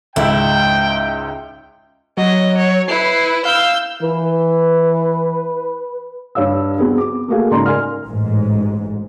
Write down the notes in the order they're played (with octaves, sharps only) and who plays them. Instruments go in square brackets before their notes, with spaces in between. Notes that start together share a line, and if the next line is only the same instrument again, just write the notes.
[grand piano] C#2 G#2 E5 [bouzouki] E4 [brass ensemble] G5
[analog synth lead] F#3 [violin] D#5
[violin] C#5
[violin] E4 B4 [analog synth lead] C7
[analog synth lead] F5 [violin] E6 G6
[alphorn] E3 [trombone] B4
[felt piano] G2 C#5 F5 E6
B3 C4 F#4 G#4
D6
A3 A#3 F#4 G#4 F5 G#5
G#2 C#3 D5 A#5 C6
A#4 G#5 C6 F6
[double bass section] A1 G#2